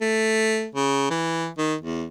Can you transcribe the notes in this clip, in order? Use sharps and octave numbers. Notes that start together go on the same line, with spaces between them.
A3
C#3
E3
D#3
E2